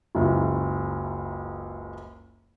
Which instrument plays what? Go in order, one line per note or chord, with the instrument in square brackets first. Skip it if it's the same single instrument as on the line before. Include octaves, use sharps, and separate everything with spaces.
[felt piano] F#1 C#2 E4